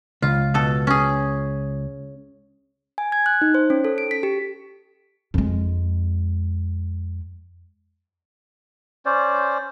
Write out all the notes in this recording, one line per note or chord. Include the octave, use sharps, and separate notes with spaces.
C#2 F4
B2 A4
C#4 G#4
G#5
G#6
F#6
D#4
C5
C#4
A4
D7
B6
G4
F2 G#3
C#4 C5 D5